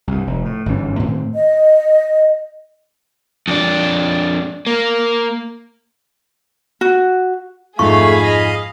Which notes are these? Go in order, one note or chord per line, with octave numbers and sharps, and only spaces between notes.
C2 G2
F1
A2
G1 G#2 E3 C#4
A2 D#3 C4
D#5
F2 D4
A#3
F#4
F2 G#2 A3 G#4 F5 B5 C#6
D#5 F5